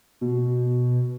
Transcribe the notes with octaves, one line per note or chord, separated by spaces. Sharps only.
B2